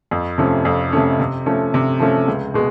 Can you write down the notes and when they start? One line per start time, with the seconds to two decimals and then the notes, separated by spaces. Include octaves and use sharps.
0.11 F2
0.38 C3 F3 A3 C#4
0.65 F2
0.93 C3 F3 A3 C#4
1.20 C3
1.46 F3 A3 C#4
1.74 C3
2.00 F3 A3 C#4
2.28 C#2
2.54 B2 G#3